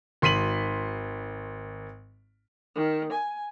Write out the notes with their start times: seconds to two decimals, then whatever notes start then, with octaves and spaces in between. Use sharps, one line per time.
0.22 G#1 C6 B6 D#7 F#7
2.75 D#3
3.11 G#5